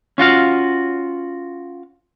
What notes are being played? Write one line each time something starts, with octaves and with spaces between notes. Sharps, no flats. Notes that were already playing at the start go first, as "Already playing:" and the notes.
C#4 F4 F#4 F5